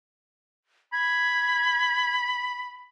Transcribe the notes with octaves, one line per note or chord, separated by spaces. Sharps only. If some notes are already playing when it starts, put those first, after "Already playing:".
B5 G#6